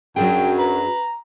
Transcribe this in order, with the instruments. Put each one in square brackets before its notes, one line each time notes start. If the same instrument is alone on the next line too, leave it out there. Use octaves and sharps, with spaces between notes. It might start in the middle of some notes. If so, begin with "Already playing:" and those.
[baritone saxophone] F#2 [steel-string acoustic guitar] F#3 D4 G#4 [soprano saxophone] G5
[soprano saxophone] B4 [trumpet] A#5